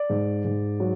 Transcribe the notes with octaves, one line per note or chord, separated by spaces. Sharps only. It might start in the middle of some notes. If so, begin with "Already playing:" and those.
Already playing: D5
G#2
G#2
F#3